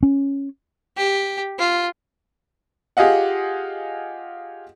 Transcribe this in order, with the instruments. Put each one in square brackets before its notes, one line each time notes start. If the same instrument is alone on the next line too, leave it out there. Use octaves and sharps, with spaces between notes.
[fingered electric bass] C#4
[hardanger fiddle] G4
F4
[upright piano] F4 G4 G#4 D#5 F5 F#5